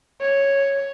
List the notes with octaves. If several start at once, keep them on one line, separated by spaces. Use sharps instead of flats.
C#5